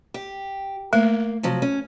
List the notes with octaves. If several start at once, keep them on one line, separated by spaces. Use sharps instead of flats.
G4
A3 A#3
C3 F3 F#3
C#4